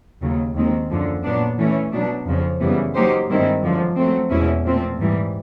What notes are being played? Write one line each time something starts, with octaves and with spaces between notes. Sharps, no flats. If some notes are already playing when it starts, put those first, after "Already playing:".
D#2 C#3 F#3
D#2 D#3 G#3 C4
F#2 D3 F3
A#2 F#3 B3 D4
E3 A3 C#4
B2 F#3 B3 D4
F2 C#3 F3
F#2 C#3 E3 G3 B3
F#3 A#3 D#4 G4 C5
G2 D#3 G#3 C4 E4
F#2 D3 F3
F#3 A3 C4
E2 B2 G#3 C#4 E4
A#2 F3 A3 C4
G#2 E3 G3